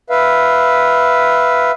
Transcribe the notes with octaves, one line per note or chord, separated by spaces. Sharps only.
B4 E5 F5